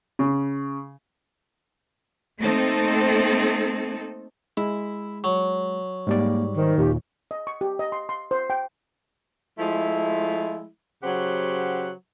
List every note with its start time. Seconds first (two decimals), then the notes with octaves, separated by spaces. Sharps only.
0.19 C#3
2.39 A3 A#3 C4 D#4 A4
4.57 G#3 E4
5.24 F#3
6.07 G#2 G3 A#3 D5
6.57 D#3 C5
6.78 D#2 A#2 G4
7.31 D#5
7.47 C#6
7.61 G4
7.79 D#5
7.92 C6
8.09 C6
8.31 C5
8.50 G5
9.59 F3 G#3 A3 E4
11.03 C#3 F#3 G4 C5 F#5